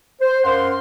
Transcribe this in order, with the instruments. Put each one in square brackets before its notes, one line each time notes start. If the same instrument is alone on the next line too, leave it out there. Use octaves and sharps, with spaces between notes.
[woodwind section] C5
F#2 A#4 F5 F#5 C6